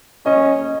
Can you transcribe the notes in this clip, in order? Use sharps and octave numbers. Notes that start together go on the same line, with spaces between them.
C#4 D#5